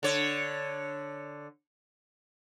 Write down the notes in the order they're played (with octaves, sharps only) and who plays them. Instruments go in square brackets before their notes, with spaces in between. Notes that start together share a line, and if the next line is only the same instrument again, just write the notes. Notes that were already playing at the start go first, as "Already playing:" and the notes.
[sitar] D3 C#5